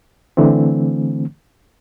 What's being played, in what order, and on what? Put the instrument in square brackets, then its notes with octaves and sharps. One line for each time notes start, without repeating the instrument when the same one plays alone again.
[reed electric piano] D3 E3 A3 C4